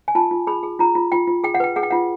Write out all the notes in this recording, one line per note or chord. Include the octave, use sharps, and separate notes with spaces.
G#5
F4 A5
F4
G#4 B5
G#4
F4 A#5
F4
F4 G5
F4
G#4 G5
F#5
B4 G5
G#4 F#5
G5
F4 F#5